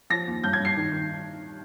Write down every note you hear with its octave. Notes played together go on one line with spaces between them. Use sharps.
F3 A#6
D#2
G2 G6
G#6
G2 C7
D#3
D#3